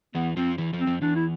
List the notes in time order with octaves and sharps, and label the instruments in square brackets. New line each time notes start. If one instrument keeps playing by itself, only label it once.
[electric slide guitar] E2 E3 [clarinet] B3
[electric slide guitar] F2 F3 [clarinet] C4
[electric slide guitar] E2 E3
F2 F3
[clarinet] C4
[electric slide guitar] F2 F3
[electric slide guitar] E2 E3 [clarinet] D4
[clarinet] E4